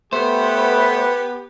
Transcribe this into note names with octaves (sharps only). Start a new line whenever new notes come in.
A3 B3 G4 C5